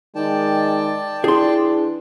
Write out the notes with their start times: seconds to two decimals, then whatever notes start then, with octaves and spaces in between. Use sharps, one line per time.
0.15 D#3 G#3 D5 G5 A5
1.24 E3 D4 G#4 C6